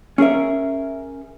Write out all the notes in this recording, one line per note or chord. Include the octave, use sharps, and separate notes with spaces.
C#4 G#4 A#4 E5